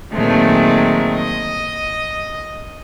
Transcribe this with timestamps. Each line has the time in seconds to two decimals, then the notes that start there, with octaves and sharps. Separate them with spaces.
0.13 A#2 D#3 F#3 G#3 A3 C4
1.15 D#5